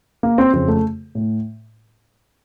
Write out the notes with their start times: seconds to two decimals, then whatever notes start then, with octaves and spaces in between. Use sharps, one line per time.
0.23 A#3
0.38 C4
0.53 F2 C#3 C4
0.68 A3
1.15 A2